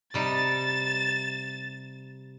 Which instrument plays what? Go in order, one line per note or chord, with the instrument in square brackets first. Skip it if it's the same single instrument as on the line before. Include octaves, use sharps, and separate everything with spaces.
[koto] C3 G3 D#4 [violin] A6 E7